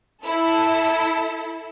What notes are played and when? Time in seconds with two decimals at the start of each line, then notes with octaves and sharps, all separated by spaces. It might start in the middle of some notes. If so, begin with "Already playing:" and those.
0.23 E4 A4